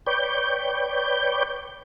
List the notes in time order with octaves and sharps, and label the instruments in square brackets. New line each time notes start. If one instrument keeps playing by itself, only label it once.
[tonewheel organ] B4 C#5 D5 G5 G6